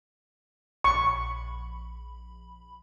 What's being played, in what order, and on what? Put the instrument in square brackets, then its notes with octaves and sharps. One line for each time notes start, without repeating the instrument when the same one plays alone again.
[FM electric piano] A#1 B5 [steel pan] C#6